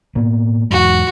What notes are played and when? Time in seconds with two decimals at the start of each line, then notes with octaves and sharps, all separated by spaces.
0.15 A2 A#3 B3
0.71 E2 G#2 G#3 F#4